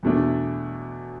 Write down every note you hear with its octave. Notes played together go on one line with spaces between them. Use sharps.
E2 B2 A3 D4